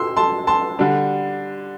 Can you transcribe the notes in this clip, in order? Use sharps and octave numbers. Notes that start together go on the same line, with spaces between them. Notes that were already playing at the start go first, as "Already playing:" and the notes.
Already playing: C6 E6
A5 C6
A5 C6
D3 G3 D4